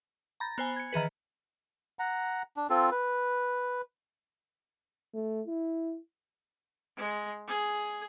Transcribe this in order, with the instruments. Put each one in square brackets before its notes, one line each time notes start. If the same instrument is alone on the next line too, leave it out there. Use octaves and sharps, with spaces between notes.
[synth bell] A#5 B5 G6 A6 A#6
B3 C5 G#5
G#6 C#7
D#3 E3 G#4 B4
[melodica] F#5 A#5
D4
C4 F4 A4
B4
[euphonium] A3
E4
[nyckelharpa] G#3
G#4